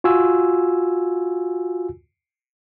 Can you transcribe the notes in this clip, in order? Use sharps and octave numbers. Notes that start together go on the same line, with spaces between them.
F4 F#4 G#5 E6